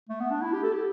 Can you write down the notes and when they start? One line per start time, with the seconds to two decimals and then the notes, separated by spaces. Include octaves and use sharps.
0.09 A3
0.20 B3
0.31 D4
0.42 E4
0.53 G4
0.63 A4
0.73 G4